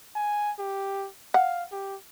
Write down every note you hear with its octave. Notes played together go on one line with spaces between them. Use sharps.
G#5
G4
F5 F#5
G4